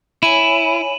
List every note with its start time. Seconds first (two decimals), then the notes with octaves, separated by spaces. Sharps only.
0.23 E4 C#5 G#5 B5 D#7 E7 F#7